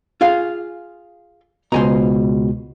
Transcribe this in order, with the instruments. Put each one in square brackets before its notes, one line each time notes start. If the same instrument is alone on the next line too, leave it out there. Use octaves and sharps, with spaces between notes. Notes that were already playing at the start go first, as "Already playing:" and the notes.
[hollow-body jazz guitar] F4 G#4 F5
[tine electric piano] C#2 B2 [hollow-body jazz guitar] C5 G#5 A#5